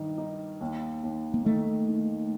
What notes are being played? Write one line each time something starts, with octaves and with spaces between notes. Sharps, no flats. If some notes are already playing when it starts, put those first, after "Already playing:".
Already playing: G2 D#3
D#4
D#2
D#2
A#3
D#3 A3
D#3